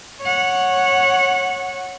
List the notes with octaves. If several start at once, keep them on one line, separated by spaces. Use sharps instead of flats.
C#5 F#5